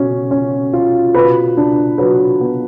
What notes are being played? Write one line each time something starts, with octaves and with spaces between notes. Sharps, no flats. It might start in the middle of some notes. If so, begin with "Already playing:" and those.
Already playing: B2 C#4
C#4
F4
B2 B4
D4
F#3 B4
B3